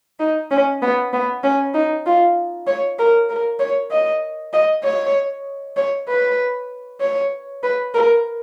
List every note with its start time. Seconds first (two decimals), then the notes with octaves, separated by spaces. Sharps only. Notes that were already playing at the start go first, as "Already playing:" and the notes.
0.20 D#4
0.51 C#4
0.82 B3
1.13 B3
1.43 C#4
1.74 D#4
2.06 F4
2.67 C#5
2.99 A#4
3.30 A#4
3.60 C#5
3.91 D#5
4.53 D#5
4.84 C#5
5.77 C#5
6.08 B4
7.00 C#5
7.63 B4
7.94 A#4